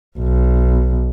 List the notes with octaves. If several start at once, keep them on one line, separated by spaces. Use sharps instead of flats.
B1